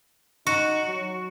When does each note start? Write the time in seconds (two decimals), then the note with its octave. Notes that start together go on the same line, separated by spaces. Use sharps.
0.47 D#4 F#4
0.87 F#3